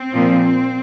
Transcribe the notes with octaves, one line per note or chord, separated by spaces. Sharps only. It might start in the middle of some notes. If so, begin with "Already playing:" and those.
Already playing: C4
A#2 F3